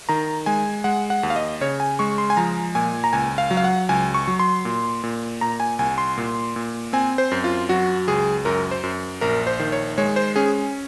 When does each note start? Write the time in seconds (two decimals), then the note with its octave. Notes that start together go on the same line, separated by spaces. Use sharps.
0.09 D#3 A#5
0.46 G#3 G#5
0.84 G#3 F#5
1.10 F#5
1.23 D#2
1.30 F5
1.36 D#5
1.61 C#3 C#5
1.80 G#5
1.99 G#3 C#6
2.18 C6
2.30 G#5
2.37 F3 A#5
2.75 A#2 G#5
3.04 A#5
3.13 C#2 G#5
3.38 F5
3.51 F#3
3.57 F5
3.64 F#5
3.89 C#2 G#5
4.14 C#6
4.27 F#3
4.39 C6
4.65 A#2
5.03 A#2
5.41 A#2 A#5
5.60 G#5
5.79 C2 G#5
5.98 C6
6.18 A#2
6.56 A#2
6.93 C4 G#5
7.18 C5
7.31 F#2
7.44 F4
7.69 F#3 F#4
8.08 C#2 G#4
8.45 F#2 A#4
8.71 C5
8.83 F#2
9.21 A#1 A#4
9.47 C5
9.60 D#3
9.72 C#5
9.98 G#3 C#5
10.16 C5
10.36 C#4 G#4